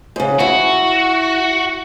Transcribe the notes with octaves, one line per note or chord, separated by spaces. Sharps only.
G#2 C#3
E4 F#4 F#5